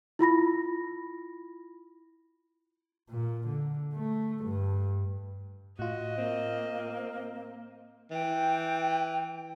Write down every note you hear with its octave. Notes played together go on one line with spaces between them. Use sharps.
E4 F4 B5 A#6
A#2
D3
A3
G2
A2 F4 F#4 D#5
A#3 C4
E3 G5